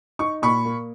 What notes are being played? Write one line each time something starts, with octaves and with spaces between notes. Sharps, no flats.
D#4 C#6
A#2 B5 C#6
A#3